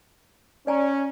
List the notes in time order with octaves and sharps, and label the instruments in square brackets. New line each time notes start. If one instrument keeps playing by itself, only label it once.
[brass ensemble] C#4 [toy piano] D5 G#5 A#5